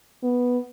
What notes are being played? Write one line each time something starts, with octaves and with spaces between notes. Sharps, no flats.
B3